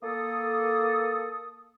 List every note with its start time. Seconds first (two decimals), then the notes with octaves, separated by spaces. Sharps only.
0.03 A#3 A4 D#6